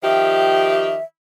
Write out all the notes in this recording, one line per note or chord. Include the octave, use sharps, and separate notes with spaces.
D#3 F3 G4 E5